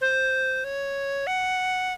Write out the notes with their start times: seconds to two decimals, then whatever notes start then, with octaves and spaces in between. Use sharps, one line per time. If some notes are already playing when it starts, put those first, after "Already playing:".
0.01 C5
0.64 C#5
1.27 F#5